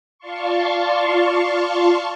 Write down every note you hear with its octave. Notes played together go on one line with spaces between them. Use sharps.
F4 D5 F5 A5 C6 C#6